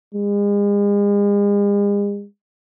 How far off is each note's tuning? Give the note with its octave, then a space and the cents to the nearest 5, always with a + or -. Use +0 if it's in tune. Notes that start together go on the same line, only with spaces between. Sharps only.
G#3 -40